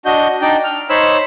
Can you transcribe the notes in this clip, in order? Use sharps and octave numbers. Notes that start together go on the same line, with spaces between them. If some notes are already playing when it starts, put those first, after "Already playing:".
D4 F#4 D#5 G6
D4 D#4 D5 G5
F6
D#4 C5 C#5 B5 E6